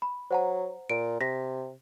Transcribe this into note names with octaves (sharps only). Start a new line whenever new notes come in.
B5
F#3 C5 F#5 A#5
A#2 D7
C3 A#6 B6